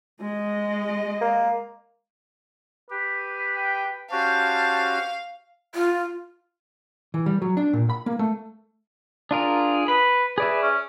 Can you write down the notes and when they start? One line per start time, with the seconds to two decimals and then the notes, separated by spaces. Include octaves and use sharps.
0.21 G#3 D#5
1.21 A#3
2.90 G4 B4
3.56 G5
4.11 C#4 F#4 G4 C5 F5 A5
5.75 F4
7.14 E3
7.26 G3
7.42 F#3
7.57 D4
7.73 A#2
7.90 B5
8.06 A#3
8.19 A3
9.31 D4 F4 G#4 A#4
9.88 B4 B5
10.38 G#4 B4 D5 E5
10.63 C#4